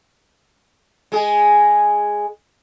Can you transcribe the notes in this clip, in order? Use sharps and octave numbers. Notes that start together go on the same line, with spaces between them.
G#3 G#4